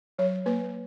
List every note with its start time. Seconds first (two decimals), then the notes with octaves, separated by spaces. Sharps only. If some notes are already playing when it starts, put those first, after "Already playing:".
0.19 F#3 C#5
0.46 A#3 B4